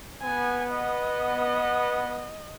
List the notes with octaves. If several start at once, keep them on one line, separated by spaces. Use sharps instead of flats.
B3 G#5
D#5